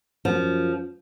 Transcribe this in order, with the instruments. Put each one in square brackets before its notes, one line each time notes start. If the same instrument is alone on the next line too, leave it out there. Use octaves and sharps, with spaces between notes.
[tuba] F#2 [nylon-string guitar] F3